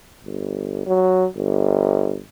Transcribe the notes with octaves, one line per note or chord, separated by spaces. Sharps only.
G1
F#3
G1